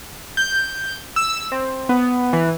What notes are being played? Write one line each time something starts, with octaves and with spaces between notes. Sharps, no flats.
G6
E6
C4
B3
E3